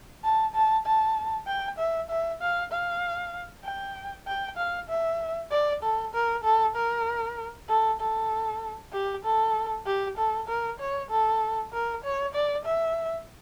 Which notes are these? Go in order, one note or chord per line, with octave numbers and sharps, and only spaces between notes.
A5
A5
A5
G5
E5
E5
F5
F5
G5
G5
F5
E5
D5
A4
A#4
A4
A#4
A4
A4
G4
A4
G4
A4
A#4
C#5
A4
A#4
C#5
D5
E5